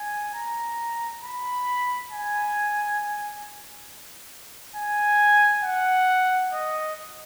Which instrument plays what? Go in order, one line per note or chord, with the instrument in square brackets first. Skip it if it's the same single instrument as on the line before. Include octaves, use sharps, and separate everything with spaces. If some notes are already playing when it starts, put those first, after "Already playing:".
Already playing: [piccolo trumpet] G#5
A#5
B5
G#5
G#5
F#5
D#5